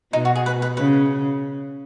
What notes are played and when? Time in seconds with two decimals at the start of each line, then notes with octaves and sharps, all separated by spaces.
0.13 B2 D#4
0.25 F#4
0.36 G#4
0.46 B4
0.62 B4
0.77 C#3 B4